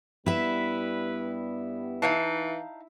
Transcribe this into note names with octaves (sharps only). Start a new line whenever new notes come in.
G2 G3 B3 E4 B4 E5
E3 D#4 F5 A5